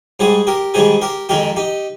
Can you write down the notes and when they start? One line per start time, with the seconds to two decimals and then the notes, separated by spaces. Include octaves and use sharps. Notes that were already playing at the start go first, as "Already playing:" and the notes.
0.20 G#2 G3 G#4 C5
0.47 G4 A#4
0.74 G#2 D#3 G3 G#4 C5
1.01 G4 A#4
1.29 F2 D#3 G#3 G4 A#4
1.56 D#4 G4